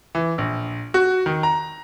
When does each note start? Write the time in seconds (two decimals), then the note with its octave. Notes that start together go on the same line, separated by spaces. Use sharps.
0.15 E3
0.38 A#1
0.94 F#4
1.26 D#3
1.43 A#5